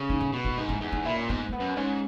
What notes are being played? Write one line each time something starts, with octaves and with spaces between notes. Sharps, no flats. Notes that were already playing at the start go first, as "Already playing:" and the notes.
Already playing: C#3
D#4
D#4
B2
E4
G#2 D#4
E4
E2 D#4
D#4
A#2 E4
C#4
G#2 B3
A#3
B3
F#2
G#2 C#4